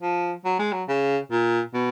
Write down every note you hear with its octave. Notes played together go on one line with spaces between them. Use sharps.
F3
F#3
G#3
F#3
C#3
A#2
B2